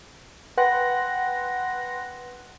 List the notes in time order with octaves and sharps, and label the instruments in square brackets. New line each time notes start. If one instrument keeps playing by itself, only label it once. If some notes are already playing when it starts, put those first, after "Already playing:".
[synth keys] B4 F#5 G5 C6 F#6 A#6